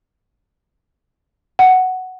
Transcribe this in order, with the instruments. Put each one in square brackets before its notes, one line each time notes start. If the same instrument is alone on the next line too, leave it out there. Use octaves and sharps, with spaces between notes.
[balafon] F#5